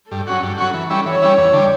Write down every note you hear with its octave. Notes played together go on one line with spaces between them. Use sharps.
G2 A4
F#3 C#4 F#4
G2
F#3 C#4 F#4
E3
G3 C#4 E4
E3 C#5
G3 C#4 E4
E2
D3 G3